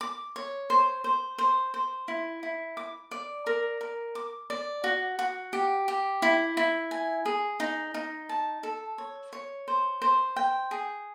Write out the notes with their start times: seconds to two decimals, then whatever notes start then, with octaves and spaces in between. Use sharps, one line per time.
0.01 D6
0.36 C#5
0.70 C5
1.04 C5
1.38 C5
1.74 C5
2.08 E4
2.43 E4
2.77 D6
3.11 D5
3.46 A#4
3.81 A#4
4.15 D6
4.50 D5
4.84 F#4
5.19 F#4
5.53 G4
5.88 G4
6.22 E4
6.57 E4
6.91 G#5
7.26 G#4
7.60 D#4
7.94 D#4
8.29 A5
8.63 A4
8.98 C#5
9.33 C#5
9.68 C5
10.02 C5
10.36 G5
10.71 G#4